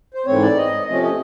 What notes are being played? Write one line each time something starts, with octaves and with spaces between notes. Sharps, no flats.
C5
G#2 E3 A3 C4 C#5
D5
D#5
C3 F3 A3 C#4 D#5
D#5